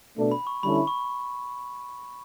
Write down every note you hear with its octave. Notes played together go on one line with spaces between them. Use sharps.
B2 A3 D4 A4
B5
C#6
D3 G3 C#4 E4 A4 B5
B5
C#6